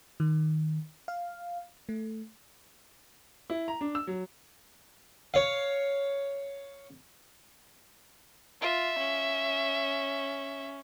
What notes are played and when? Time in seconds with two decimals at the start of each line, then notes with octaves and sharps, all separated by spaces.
0.20 D#3
1.08 F5
1.89 A3
3.50 E4
3.68 A#5
3.81 D4
3.95 E6
4.07 F#3
5.34 C#5 F5
8.62 F4 E5
8.99 C#4